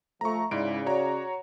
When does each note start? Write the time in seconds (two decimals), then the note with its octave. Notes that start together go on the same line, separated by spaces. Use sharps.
0.21 F3 A3 A#5 C#6
0.51 G#2 C#3 E4 D5 D7
0.86 F#4 C#5 A#5